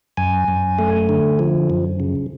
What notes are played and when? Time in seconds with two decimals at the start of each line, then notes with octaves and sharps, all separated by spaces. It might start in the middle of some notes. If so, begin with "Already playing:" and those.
0.17 F#2 G#5
0.48 F#2
0.79 A3
1.09 D3
1.39 F3
1.70 F#2
2.00 C#3